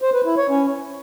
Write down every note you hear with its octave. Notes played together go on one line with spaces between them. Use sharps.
C5
B4
E4
C#5
C#4